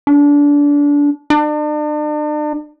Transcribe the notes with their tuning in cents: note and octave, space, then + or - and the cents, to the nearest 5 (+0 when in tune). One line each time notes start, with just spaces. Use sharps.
D4 -25
D4 +40